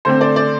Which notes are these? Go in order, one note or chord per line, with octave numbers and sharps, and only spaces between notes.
D3 A3 C4 C5
D5
D5